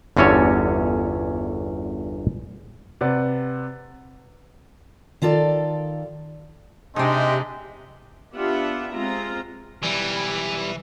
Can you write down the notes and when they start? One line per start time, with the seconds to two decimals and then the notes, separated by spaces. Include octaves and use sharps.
0.17 G1 E2 D3 C#4 A4 C#5
3.01 C3 B4 D5 F#5 A6
5.22 D#3 F4 A4 D5
6.96 C3 G#3 C4 D4 D#4 G4 D#5 E5
8.34 B3 D4 F4 G4 E5 F#5
8.93 G#3 C4 F4 A#5
9.83 B1 E3 G3